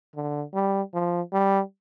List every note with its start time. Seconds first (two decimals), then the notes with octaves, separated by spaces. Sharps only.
0.16 D3
0.54 G3
0.94 F3
1.33 G3